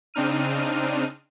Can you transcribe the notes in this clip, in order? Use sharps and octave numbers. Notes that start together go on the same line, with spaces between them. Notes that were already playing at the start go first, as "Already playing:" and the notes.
C#3 C4 D4 D#4 F6 D#7